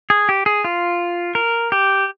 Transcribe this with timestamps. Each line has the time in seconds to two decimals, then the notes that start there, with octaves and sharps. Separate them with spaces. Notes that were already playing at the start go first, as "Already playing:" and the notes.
0.10 G#4
0.29 G4
0.46 G#4
0.64 F4
1.35 A#4
1.72 G4